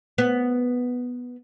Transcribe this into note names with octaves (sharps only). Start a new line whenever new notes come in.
B3